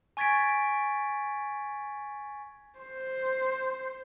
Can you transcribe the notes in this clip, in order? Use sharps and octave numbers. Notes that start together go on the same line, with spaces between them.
G#5 C#6 G#6 A6 B6 D7
C5